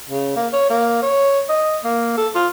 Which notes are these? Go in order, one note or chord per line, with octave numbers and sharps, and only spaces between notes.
C#3
A#3
C#5
A#3
C#5
D#5
A#3
A4
F4